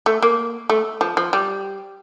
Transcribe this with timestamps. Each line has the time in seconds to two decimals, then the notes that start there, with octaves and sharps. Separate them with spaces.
0.06 A3
0.23 A#3
0.70 A3
1.01 F3
1.17 F3
1.33 G3